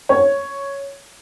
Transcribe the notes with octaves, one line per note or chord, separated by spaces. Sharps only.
C#5